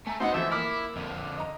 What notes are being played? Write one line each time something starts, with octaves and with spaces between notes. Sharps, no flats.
A3 G#5 A#5
F#3 B3 D#4 C5 F#5
E3 F3 A3 E5
A#3 E4 D6 F6
F2 D3
D#5 A#5